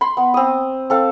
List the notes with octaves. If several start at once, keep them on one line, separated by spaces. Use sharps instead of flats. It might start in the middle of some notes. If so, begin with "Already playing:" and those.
B5 C6
B3
C4 D#6
C4 A4 F5